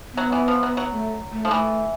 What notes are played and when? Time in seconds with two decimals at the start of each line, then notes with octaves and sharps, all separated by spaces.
0.13 F#3 B3
0.32 E3
0.48 F3
0.63 F#3
0.77 F#3
0.92 A3
1.32 A3
1.45 F3
1.51 E3 A3